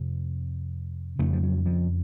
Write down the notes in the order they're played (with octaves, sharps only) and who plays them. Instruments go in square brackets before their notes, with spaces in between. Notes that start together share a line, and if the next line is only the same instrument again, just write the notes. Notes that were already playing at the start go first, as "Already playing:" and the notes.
Already playing: [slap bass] F2 C3
F2 C#3 A3
F3
F#3
F3